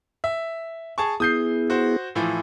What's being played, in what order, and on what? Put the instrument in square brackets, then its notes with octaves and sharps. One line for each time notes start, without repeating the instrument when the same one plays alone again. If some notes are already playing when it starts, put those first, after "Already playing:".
[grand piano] E5
G#4 A5 C#6
[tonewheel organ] B3 E4 G#4 [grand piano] D#6 G6 C7
[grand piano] F#4 C5
A2 E3 F3